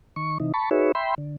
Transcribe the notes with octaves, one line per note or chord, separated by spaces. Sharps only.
D#3 C#6
C3 E3 D#4
A5 B5 C#6
D#4 F#4 G#4 B4 C#5 E5
E5 G5 B5 C6
D3